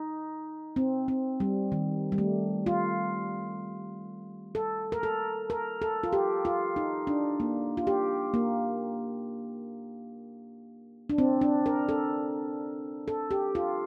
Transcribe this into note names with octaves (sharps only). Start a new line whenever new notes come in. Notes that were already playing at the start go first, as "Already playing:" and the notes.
Already playing: D#4
C4
C4
G3
D#3
G3
A3
F4
A4
A#4
A4
A#4
A4
F4
G4
F4
D#4
D4
A#3
F4
G4
A#3
D4
C4
D4
A#4
A4
A4
G4
F4